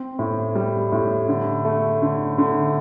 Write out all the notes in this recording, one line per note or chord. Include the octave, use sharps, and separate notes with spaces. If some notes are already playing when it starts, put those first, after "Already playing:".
Already playing: C4
A2
G3
A2
D3
A3
D3
D3